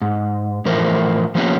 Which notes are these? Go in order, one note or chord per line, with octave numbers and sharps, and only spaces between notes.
G#2
A2 E3 F3 A#4 C5
F3 A#3 B3 C#4 F4 G4